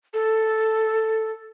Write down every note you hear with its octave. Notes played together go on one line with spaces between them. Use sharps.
A4